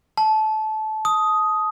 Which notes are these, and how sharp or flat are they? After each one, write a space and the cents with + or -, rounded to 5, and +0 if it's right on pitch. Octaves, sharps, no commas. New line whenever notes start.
A5 -20
D#6 +10